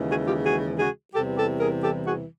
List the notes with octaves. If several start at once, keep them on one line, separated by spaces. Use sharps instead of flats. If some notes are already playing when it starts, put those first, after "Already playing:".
Already playing: D#2 C#3 E3 G#3
F#4 G#4
F4 G4
F#4 G#4
F#4 G#4
E2 C3 E3 G3 G4 A4
G4 A4
G#4 A#4
G4 A4
F#4 G#4